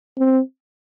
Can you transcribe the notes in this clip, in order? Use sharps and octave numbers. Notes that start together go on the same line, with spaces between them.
C4